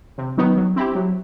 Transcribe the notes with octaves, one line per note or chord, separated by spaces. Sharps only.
C3
D#3 F#3 B3
F#3
C4 E4 G4
F#3